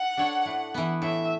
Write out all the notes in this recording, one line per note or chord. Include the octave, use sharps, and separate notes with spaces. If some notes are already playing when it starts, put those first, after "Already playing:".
Already playing: F#5
D4 A4 C#5
A2
E3 B3
A2 E5